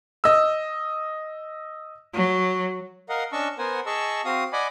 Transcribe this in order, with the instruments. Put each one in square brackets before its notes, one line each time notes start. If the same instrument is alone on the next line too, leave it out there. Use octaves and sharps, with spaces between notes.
[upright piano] D#5 E6
[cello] F#3
[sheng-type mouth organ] A#4 D#5 F5 F#5
C#4 D4 D#5 A5 C#6 E6
B3 A#4 C5 F#5 G#5
G#4 D#5 A5 C#6 E6
C4 F#4 F5 D#6
D5 D#5 F#5 G#5 B5 D6